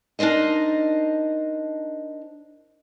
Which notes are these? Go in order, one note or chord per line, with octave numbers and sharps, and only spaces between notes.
D4 D#4 A#4 C5 D#5